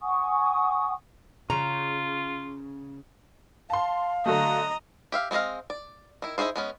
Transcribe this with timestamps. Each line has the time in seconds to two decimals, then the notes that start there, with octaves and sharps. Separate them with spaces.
0.02 F#5 G#5 C#6 D#6
1.50 C#3 F4 A#5
3.70 F5 A5 C6
4.26 D3 F#3 A3 D#5 A#5
5.12 G4 E5 F5
5.31 G#3 C4 G#4 D#5 F5
5.70 D5
6.22 D#3 E4
6.38 D#4 E4 F#4 G#4 C5
6.56 G#3 B3 C#4